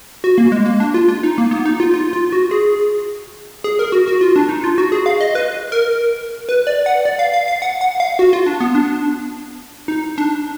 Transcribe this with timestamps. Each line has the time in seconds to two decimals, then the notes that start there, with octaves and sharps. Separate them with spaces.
0.24 F#4
0.38 A#3
0.52 G#3
0.66 A#3
0.80 D4
0.94 F4
1.08 F4
1.23 D#4
1.38 A#3
1.51 B3
1.65 D#4
1.80 F4
1.94 F4
2.13 F4
2.32 F#4
2.51 G#4
3.64 G#4
3.79 A#4
3.92 F#4
4.08 F#4
4.21 F4
4.36 D4
4.49 D#4
4.64 F4
4.78 F#4
4.92 G#4
5.06 F5
5.21 D#5
5.35 B4
5.72 A#4
6.49 B4
6.67 D5
6.86 F#5
7.05 D5
7.19 F5
7.34 F5
7.48 F5
7.62 F#5
7.81 F#5
8.00 F5
8.19 F#4
8.33 F4
8.46 D4
8.60 B3
8.75 D4
9.88 D#4
10.18 D4